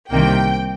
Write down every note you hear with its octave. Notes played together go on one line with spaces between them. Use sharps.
C2 C3 D#3 A#3 G5